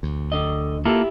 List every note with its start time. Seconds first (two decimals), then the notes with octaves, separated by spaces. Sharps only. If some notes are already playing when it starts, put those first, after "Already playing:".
0.03 D2
0.32 D3 D#5
0.85 A#3 E4 F4 G4 A4